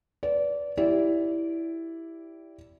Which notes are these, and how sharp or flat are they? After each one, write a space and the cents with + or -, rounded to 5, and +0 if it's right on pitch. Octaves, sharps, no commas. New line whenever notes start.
B4 +5 D5 -25
E4 +0 G4 +0 D5 -15